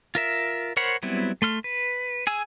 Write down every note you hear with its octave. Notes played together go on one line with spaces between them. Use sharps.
F4 A#4 E5
A#4 C5 C#5 F#5 B5
F#3 G3 B3 C4 E4
A3 C6 F6
B4
G#4 G#5 E6